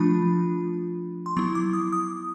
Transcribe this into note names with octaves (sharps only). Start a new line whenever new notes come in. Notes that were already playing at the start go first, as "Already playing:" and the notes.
Already playing: F3 A3 D4 F4 B5
C6
F#3 B3 E4 C#6
D6
D#6
D#6